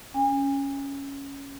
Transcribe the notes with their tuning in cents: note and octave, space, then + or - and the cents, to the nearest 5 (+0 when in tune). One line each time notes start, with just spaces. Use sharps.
C#4 +0 G#5 -35